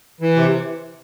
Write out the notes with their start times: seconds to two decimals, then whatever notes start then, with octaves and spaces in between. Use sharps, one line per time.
0.21 E3
0.36 C3